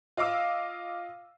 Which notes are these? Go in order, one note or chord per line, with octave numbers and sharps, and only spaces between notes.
F4 D#5 F5 D6 E6